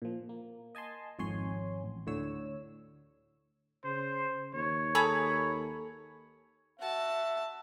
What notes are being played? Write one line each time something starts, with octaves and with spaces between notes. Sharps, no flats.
A#2 F3
A#3
D#5 G#5 A5 C6
G#1 F2 C#5 G#5 C6
A1
D2 A2 D3 C#5 E6
C#3 C5
D#2 C#5
G#4 A4 A#5 B5
F#4 E5 A5